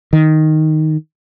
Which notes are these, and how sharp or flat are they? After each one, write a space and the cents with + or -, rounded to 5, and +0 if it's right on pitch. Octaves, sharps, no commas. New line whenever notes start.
D#3 +0